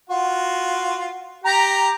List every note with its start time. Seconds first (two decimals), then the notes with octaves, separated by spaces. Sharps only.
0.10 F4 F#4
1.44 G4 A#5